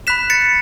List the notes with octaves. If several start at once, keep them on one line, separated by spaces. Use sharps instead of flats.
B5 F#6 B6 E7
A6 C#7